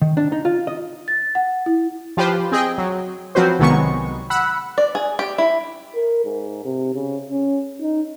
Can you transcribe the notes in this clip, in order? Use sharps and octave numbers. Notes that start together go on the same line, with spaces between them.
D#3
D4
D#4
F4
D#5
A6
F#5
E4
F3 F4 G4 B4 C5
C4 G#4 D#5 G5
F#3
F3 F#3 C4 F#4 B4 C5
C2 D#3 F#3 G#3 B3 C#6
F#5 B5 E6 F#6
D5
G#4
G4
E4
A#4
G#2
C3
C#3
C#4
D#4